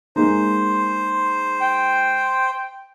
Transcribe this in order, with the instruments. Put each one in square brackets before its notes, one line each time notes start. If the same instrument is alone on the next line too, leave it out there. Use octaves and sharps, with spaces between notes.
[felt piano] G#3 A#3 D#4 [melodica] C5
[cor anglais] G5